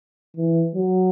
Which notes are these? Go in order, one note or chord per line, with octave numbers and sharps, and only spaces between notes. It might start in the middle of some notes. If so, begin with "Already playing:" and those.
E3
F#3